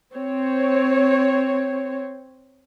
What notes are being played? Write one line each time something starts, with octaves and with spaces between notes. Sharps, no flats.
C4 C#5